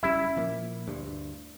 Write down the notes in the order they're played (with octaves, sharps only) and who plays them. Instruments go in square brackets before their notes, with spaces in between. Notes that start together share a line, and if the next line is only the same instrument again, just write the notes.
[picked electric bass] F#1 G3 C#4 [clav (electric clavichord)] E4
[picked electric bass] A#2 F3 A#3
D2 G2